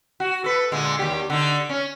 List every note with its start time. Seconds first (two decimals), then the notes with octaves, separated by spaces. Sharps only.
0.20 F#4
0.44 A4 B4
0.72 A#2 D3 G#3
0.99 D#2 G4
1.30 D3 D#4
1.69 C#4